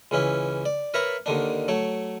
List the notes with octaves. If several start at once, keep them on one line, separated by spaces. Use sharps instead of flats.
C#2 E3 C#4 E4
D5
A#4 B4 C#5 E5 A#5 B5
D#2 D3 D#3 D4
F#3 A3 C#5